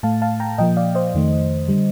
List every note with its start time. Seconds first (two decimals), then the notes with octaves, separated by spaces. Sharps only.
0.03 A2 A3 F5 A5
0.22 F5 A5
0.40 G5 A#5
0.58 A#2 F3 A#3 D#5 G5
0.77 D5 F5
0.95 C5 D#5
1.14 F2 D#3 A3
1.68 D3 G3